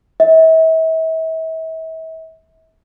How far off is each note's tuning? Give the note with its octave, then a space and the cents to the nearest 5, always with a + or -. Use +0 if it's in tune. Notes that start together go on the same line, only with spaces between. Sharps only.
E5 -40